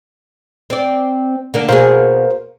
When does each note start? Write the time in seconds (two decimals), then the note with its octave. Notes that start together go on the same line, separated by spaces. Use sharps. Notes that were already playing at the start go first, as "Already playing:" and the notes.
0.70 C4 D5
1.54 D3 A#3 D4
1.69 B2 A#3 G#4 A#4 C5 F5